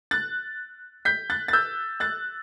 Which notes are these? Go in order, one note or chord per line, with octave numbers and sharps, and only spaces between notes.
F#6 A6
G6 B6
F#6 A6
A6
E6 G6
F#6 A6